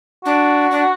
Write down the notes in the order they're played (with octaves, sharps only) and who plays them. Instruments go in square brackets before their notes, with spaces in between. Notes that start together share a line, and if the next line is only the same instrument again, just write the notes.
[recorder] D4 [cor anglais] F#4
[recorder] D4